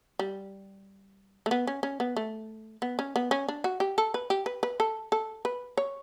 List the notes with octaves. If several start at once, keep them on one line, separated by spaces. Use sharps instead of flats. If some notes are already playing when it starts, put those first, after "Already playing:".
G3
A3
B3
C#4
C#4
B3
A3
B3
C#4
B3
C#4
D4
F#4
G4
A4
B4
G4
B4
B4
A4
A4
B4
C#5